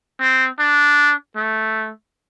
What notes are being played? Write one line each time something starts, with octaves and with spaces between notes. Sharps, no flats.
C4
D4
A3